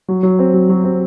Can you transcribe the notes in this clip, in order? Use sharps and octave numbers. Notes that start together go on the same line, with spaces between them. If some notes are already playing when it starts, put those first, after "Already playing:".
F#3
F#3
C4
F#3
F#3
C4